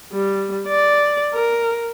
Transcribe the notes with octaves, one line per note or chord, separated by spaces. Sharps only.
G3
D5
A#4